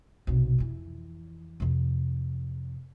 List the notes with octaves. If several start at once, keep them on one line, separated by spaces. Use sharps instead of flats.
B1 C3
F2 E3
F2 C3